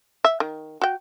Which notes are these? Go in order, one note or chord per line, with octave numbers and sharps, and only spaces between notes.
E5
D#3
F#4 G5